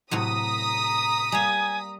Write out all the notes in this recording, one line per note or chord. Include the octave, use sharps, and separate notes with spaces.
A2 C3 F#3 A#5 D#6 B6
G3 A#3 G#5